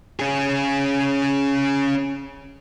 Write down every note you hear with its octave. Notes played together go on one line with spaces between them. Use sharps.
C#4 G#4